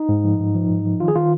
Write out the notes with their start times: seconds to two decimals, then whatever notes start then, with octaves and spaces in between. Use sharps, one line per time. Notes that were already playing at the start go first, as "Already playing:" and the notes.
Already playing: D#4
0.09 G#2
0.24 F3
0.39 G#2
0.55 F3
0.70 G#2
0.85 F3
1.00 D#3 F4
1.08 G#4
1.16 D#3 F4